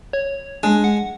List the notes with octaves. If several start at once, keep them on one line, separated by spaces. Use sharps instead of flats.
C#5
G#3 D4
F#5